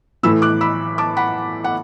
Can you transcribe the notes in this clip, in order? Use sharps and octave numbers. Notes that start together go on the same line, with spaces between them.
A2 E3 A3 B5 E6
D6 F#6
B5 E6
A5 D6
F#5 B5
F#5